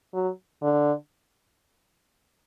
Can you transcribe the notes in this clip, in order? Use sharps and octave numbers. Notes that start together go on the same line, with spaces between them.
F#3
D3